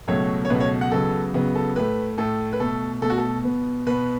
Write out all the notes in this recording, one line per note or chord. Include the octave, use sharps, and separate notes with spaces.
C#2 B2 F#3 A3 C#5
C#5
C#2 B2 F#3 A3 B4
C#5
F#5
C#2 C#3 F#3 B3 A4
C#2 C#3 F#3 B3
A4
A2 A3 B4
A2 A3 A4
B4
B2 A3 A4
B2 A3 A4
F#4
A4
B2 B3
B2 B3 B4